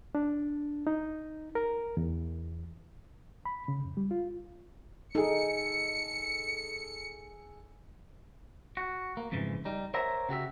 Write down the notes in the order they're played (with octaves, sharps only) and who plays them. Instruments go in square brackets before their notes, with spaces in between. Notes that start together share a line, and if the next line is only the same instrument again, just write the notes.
[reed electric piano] D4
D#4
A#4
E2
B5
C#3
F2
G3
F4
[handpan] D#4 [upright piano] G#4 A4 [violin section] C#7
[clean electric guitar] F#4
A#3
F2 G#2 C#3 E3
G3 D#4
A#4 C5 C#5 E5 F#5 A#5
C#3 F#4 G4 E5